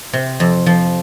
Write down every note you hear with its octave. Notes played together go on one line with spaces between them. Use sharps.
C3
F2
F3